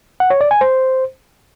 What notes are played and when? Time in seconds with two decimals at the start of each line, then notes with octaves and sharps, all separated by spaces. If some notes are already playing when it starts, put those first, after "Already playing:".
0.20 F#5
0.30 C#5
0.41 D5
0.51 G#5
0.61 C5